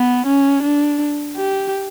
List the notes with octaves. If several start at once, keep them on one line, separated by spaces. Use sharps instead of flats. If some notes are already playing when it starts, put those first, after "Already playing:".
Already playing: B3
C#4
D4
G4